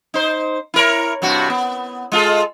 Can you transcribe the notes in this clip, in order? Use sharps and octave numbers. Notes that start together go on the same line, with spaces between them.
D#4 C5
E4 A#4 C#5
G2 C3 F#4
B3
G#3 F4 A4